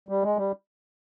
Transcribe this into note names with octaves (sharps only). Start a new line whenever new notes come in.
G3
G#3
G3